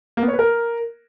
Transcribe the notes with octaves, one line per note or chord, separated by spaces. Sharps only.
A#3
B3
C#5
B4
A#4